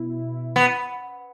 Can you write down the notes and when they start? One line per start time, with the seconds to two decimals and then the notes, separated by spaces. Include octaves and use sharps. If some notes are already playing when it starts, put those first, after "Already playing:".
Already playing: B2 E4
0.56 B3